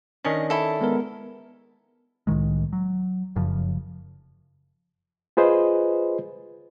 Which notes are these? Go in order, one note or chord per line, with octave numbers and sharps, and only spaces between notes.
D#3 C#4 D4 D#5
E4 A4
G#3 B3 A#4
C2 A2 D#3 G#3
F#3
F1 F#2 C#3 F3
F4 G#4 B4 C5 D#5